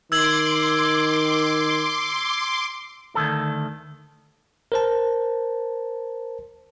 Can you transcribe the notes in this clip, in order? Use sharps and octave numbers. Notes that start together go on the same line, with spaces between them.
D#3 C6 D6 E6 G#6 F#7
D2 D#3 A4
A#4 C5 A5